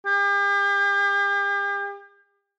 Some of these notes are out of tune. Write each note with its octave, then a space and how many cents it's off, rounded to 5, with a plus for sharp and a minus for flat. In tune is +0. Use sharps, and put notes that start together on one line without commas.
G4 +40